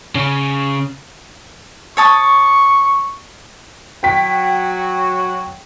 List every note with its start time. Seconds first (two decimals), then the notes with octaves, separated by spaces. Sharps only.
0.15 C#3 C#4
1.97 C#5 A5 C#6 D#6
4.03 F#3 F#4 G5 B6